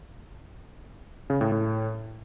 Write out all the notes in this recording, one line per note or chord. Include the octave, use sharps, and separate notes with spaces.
C#3
A2
A2